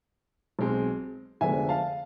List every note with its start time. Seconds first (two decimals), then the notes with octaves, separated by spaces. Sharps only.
0.59 B1 B2 G#3 C4
1.41 F1 F2 D3 G#3 B3 E5 G#5
1.69 F5 A5